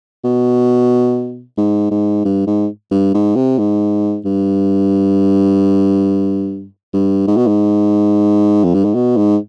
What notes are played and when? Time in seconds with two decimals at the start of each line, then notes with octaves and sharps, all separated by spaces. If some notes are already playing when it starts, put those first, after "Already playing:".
0.24 B2
1.57 G#2
1.90 G#2
2.25 G2
2.47 G#2
2.91 G2
3.14 G#2
3.36 C3
3.58 G#2
4.25 G2
6.93 G2
7.27 G#2
7.37 B2
7.47 G#2
8.64 F2
8.74 G2
8.84 G#2
8.95 B2
9.17 G#2